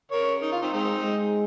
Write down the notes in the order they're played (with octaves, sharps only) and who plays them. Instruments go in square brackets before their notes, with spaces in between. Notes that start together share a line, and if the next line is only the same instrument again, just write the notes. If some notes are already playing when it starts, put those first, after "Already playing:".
[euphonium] C#3 [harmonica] A#4 C#5
[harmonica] D#4
F4
C4 D#4
[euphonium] G#3 [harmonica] C4 D#4
[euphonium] G#3